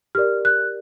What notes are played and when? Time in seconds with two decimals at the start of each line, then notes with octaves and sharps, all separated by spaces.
0.15 G4 A#4 D5 F6
0.45 F#6